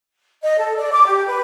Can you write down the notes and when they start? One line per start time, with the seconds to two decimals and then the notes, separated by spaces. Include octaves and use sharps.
0.43 D#5
0.58 A4
0.76 D5
0.92 D6
1.06 G4
1.27 B4